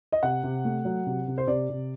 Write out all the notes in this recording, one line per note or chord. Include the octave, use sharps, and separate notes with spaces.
D#5
C3 F#5
C3
A3
F#3
C3
C3
C5
C3 D5
C3